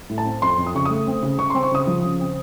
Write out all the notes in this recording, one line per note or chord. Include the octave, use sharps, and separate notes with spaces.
A2
A5
C4
F2 C6
F2
D#6
C#3 C#6
A3 D#6
C4
C#3
C#3 C#6
C4 C6
C#6
C#3 D#6
F3
C#3
C4